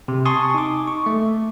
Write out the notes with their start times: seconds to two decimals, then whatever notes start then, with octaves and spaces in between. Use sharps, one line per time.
0.08 C3
0.25 G#5 A5 C6 C#6 D#6
0.54 D#4 D6
0.87 C#6
1.06 A3